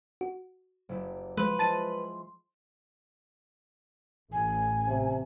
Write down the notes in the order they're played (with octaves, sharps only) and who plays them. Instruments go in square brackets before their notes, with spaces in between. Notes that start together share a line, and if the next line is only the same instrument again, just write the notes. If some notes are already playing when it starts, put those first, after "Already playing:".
[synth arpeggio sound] F#4
[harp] F#1 E4 G4
[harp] F3 [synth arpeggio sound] G#3 [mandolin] B4 [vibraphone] C6
[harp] G#3 E4 F4 [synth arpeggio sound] A5 A6 D#7
[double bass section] A1 [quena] G#5
[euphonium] C3